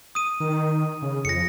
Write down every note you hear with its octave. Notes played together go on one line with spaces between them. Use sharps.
D#6 D#7
D#3
C#3
F2 A#6 C#7